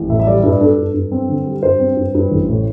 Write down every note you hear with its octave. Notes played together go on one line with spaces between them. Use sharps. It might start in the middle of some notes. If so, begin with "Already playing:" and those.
Already playing: A1
A2 E5
E5
G3 D5
E5
G2
D5
D4 A4
G2
G2
C4
D3
G3
G2 C5
C4
G2
G2
A1
A2